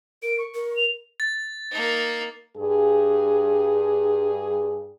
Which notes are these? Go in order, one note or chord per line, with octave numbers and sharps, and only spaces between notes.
A#4 D7
C#6
A#4
F7
A6
A#3 D#4
G2 G#4